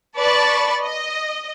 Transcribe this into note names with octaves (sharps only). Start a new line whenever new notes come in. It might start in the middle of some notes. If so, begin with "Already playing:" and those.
B4 D5 A5 B5 C#6 A6
D#5